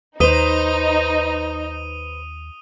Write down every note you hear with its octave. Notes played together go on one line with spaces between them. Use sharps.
D#2 D#4 B4 C5 D#6 D#7 G7